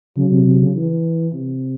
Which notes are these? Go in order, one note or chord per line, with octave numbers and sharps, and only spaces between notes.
C#3 F#3
C3
C3
C#3
E3
C3